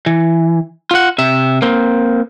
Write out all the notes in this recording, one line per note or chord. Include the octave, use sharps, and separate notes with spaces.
E3
F4 F#5
C3 E5
A#3 C4